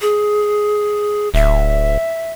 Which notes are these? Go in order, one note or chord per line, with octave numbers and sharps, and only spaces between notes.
G#4
D1 E5